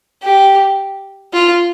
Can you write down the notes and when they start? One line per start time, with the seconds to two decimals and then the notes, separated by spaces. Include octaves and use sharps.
0.23 G4
1.34 F4